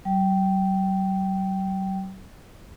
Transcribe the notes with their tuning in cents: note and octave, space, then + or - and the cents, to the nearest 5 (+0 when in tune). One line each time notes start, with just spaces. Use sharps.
F#3 +45 G5 -10